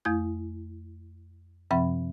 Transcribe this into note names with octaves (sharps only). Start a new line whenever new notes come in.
F2 A3 E4 G6
F#2 C3 F3 C4 E5 B5